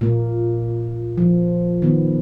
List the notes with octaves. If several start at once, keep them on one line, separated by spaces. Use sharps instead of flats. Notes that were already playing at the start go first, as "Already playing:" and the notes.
A#2 A#3
F3
D#3 B3